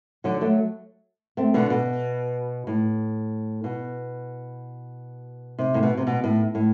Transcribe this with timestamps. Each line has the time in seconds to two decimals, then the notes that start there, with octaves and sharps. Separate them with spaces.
0.24 D3 F#3
0.41 F#3 A3
1.37 A3 C4
1.54 B2 D3
1.70 B2
2.67 A2
3.64 B2
5.59 C3
5.74 A2
5.83 B2
5.98 C3
6.07 B2
6.24 A2
6.55 A2